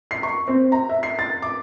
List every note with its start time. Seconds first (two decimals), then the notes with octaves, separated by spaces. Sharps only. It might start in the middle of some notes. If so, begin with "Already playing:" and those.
0.11 C7
0.23 C#6
0.48 C4
0.72 A#5
0.89 E5
1.03 C7
1.19 A6
1.42 D6